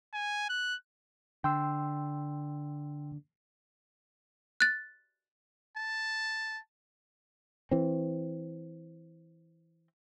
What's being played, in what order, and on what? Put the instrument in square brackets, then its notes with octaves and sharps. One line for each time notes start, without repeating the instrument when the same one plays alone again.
[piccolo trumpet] G#5
F#6
[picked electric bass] D3 [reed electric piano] G5 C6 E6
[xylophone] F#6 A6
[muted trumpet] A5
[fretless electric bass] E3 C4